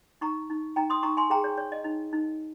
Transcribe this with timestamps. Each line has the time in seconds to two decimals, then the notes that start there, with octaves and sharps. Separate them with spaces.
0.21 D#4 A#5 C#6
0.50 D#4
0.76 D#4 G5 A#5
0.90 C6 D#6
1.03 D#4 A#5 C#6
1.17 G#5 C6
1.30 G#4 G5 A#5
1.44 C#5
1.57 C#5
1.72 D#5
1.84 D#4
2.13 D#4